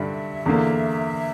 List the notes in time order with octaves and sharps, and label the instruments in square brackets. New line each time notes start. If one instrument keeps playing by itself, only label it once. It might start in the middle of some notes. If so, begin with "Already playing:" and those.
Already playing: [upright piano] G2 D3 G3 [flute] E5
[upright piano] E2 D3 A#3